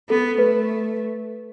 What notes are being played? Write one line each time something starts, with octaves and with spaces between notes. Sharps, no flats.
B3 A4
A3 B4